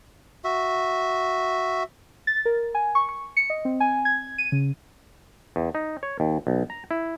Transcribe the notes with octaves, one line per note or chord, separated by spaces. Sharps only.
F#4 E5
A6
A#4
G#5
C#6
C#6
C#7
D#5
C4
G#5
G#6
D#7
C#3
E2
D#4
C#5
D#2
B1
A#5
E4